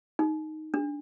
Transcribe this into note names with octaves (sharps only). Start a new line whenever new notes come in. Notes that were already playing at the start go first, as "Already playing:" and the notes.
D#4
D4